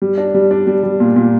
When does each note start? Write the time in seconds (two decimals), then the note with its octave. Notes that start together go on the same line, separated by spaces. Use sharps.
0.02 G3
0.18 D4
0.34 G3
0.51 D4
0.67 G3
0.83 G3
1.00 A#2
1.16 A#2